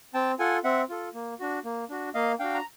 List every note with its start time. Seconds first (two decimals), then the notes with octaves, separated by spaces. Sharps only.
0.14 C4 G5 A5
0.39 F4 A4 F#5 G#5
0.64 C4 E5 F#5
0.89 F4 A4
1.14 A#3
1.40 D4 F#4
1.64 A#3
1.90 D4 F#4
2.14 A#3 D#5 F5
2.39 D4 F#4 F5 G5
2.54 A#5